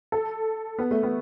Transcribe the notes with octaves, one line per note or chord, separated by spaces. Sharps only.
A4
B3
A3
B3